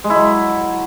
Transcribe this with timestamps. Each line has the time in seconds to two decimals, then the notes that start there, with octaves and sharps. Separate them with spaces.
0.04 G#3
0.10 E4
0.16 F#3